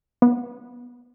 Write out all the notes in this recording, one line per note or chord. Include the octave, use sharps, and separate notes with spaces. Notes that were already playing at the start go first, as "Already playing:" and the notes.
B3